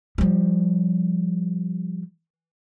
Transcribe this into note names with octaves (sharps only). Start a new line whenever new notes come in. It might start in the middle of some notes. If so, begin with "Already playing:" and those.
F3 G3